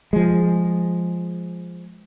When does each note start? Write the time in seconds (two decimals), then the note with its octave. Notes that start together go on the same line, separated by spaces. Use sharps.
0.13 F3 G#3